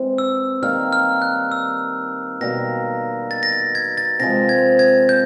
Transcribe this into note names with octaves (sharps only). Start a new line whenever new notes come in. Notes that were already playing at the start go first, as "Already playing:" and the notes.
Already playing: E3 G#3 C4
E6
D#3 G3 A#3 D#4 F6
F6
F#6
E6
B2 G3 A#3 A#6
A6
A#6
A6
G#6
A6
C3 F3 G#3 A#6
G#6
G#6
G6